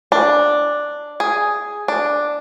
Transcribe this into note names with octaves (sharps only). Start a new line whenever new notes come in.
D4
G#4
D4